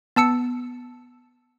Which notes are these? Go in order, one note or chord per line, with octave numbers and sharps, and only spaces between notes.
B3 A5 E6 C#7